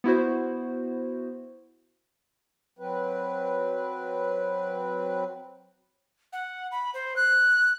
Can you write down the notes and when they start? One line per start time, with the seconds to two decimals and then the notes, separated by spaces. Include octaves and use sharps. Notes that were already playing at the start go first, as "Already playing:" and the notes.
0.04 B3 E4 F#4 C5
2.79 F#3 C4 B4
6.33 F#5
6.72 B5
6.94 C5
7.16 F#6